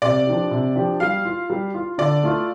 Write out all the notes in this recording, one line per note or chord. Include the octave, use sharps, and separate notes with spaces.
C3 D5
F3 D4 G4
C3
F3 D4 G4
G3 F5
F4
G3
F4
D3 D5
A3 F4